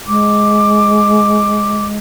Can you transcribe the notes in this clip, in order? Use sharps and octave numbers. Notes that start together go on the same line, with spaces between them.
G#3 D6